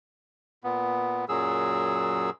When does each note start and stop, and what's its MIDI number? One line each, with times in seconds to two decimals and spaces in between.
0.64 1.25 46
0.64 1.25 59
1.29 2.30 42
1.29 2.30 46
1.29 2.30 54
1.29 2.30 68
1.29 2.30 88